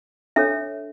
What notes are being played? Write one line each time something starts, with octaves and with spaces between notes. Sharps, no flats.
D4 A4 C#5 E5